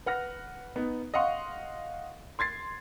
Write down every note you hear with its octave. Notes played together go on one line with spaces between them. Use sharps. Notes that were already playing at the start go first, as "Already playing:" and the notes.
B4 F#5 F6 A#6
B3 D#4
D#5 F5 F#5 C6 C#6
C6 G#6 A6 C7